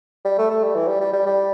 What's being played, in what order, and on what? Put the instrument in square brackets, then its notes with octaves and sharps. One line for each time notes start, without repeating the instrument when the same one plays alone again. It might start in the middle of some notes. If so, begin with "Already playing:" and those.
[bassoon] G3
A3
A3
G3
E3
G3
G3
G3
G3